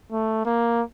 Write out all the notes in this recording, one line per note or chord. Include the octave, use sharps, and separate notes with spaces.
A3
A#3